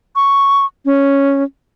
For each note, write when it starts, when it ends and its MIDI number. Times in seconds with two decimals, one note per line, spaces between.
0.16 0.65 85
0.85 1.44 61